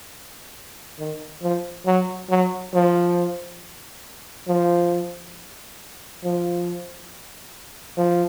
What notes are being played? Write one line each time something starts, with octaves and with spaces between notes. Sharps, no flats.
D#3
F3
F#3
F#3
F3
F3
F3
F3